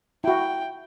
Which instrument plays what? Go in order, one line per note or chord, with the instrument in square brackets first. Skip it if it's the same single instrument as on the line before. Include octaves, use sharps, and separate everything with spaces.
[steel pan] E4 F#4 [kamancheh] G5